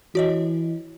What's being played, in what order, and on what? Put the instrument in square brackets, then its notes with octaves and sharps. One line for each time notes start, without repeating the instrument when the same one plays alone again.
[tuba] E3 [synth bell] F#4 C#5 D#5